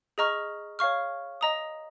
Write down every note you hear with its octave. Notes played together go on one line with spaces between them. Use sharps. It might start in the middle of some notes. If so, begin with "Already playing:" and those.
G#4 D#5 A#5 C#6 F6
C#5 F5 C#6 F6
D#5 A#5 D#6